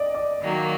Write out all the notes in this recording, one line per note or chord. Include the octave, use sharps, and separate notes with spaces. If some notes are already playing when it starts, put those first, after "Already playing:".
Already playing: D5 D#5
D5
D#3 F#3 A#3